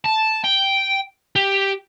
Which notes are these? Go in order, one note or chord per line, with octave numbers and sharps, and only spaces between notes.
A5
G5
G4